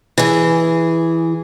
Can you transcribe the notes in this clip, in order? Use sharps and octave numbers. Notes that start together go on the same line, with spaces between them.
E3 G#4